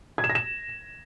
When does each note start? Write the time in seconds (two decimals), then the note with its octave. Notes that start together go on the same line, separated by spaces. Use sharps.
0.18 G#6
0.24 E7
0.30 A#6
0.35 E7